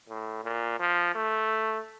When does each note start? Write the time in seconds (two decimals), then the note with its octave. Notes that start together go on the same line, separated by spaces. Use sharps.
0.09 A2
0.44 A#2
0.80 F3
1.15 A3